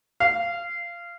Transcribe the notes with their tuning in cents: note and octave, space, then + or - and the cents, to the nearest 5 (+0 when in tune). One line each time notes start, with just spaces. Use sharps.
F5 -20